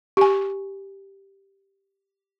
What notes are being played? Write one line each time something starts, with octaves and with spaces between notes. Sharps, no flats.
G4 G#5